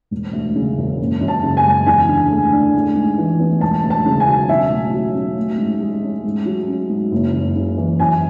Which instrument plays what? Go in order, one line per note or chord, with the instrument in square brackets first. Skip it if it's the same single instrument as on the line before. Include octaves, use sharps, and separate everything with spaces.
[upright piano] E1
D2
C#3
E1
F#1
F#2
A5
C#3
G#5
G#3
E2 G#5
D3
A3
D4
A1
G#2
E3
B3
E1 A5
D2
A5
C#3
G#5
F#3
B1 E5
A2
F#3
C#4
A1
G#2
G#3
C#4
G#2
F#3
C#4
G#2
F#1
F#2
C#3
E3
F#2 G#5